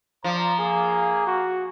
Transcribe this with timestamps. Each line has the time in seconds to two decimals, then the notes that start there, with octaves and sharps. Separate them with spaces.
0.24 F3 C5 D5 A#5
0.59 A#3 G#4
1.27 F#4